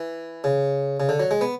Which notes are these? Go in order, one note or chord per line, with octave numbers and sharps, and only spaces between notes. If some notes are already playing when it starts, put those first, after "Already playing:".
Already playing: E3
C#3
C#3
D3
F#3
G#3
B3